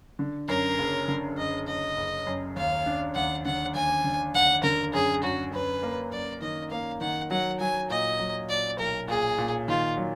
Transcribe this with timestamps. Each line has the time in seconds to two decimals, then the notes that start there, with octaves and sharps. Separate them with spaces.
0.19 D3
0.48 F#2 A#4
0.78 F#1
1.08 D3
1.38 F#2 D#5
1.67 F#1 D#5
1.97 F#1
2.27 F#2
2.56 D#2 F5
2.86 D4
3.15 D#2 F#5
3.45 D3 F#5
3.75 D#2 G#5
4.04 D3
4.34 D#2 F#5
4.63 D3 A#4
4.93 F#2 G#4
5.23 F#2 F#4
5.53 F#2 B4
5.83 A#3
6.12 F#2 D5
6.42 D#3 D#5
6.71 A#3 F5
7.01 D#3 F#5
7.31 F#3 F#5
7.60 F#3 G#5
7.90 A#2 D#5
8.19 F#3
8.49 A#2 D5
8.79 B1 A#4
9.08 A#2 G#4
9.38 A#2
9.68 D#3 F4
9.97 F#3